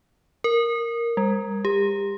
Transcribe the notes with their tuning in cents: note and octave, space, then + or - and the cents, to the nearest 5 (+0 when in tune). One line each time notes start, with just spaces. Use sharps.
A#4 +0
G3 +45
G4 +30